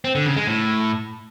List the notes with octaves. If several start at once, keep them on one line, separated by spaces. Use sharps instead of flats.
C4
D3
C#3
G#3
A2